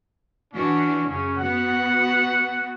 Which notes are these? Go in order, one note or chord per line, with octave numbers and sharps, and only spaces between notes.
E3 C#4 D4 F#4
F#2 C#3 C#4
B3 F#4 F#5